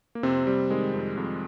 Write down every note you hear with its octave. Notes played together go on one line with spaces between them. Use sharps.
A#3
F2 C3 C4
C3 G3
D#3 G#3
F2
F2